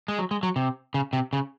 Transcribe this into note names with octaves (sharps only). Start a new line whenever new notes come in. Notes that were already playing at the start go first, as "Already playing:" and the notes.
G#3
F#3
G#3
F#3
C3
C#3
C3
C#3